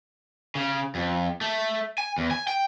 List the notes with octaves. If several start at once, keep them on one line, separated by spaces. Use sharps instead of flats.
C#3
F2
A3
G#5
E2
G#5
G5